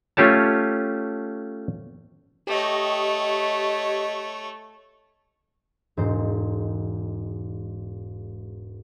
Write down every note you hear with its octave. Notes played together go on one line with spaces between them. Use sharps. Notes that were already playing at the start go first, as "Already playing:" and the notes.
A3 C#4 F4 G4 C#5 A5
A3 G4 C#5 D#5
E1 G#2 C5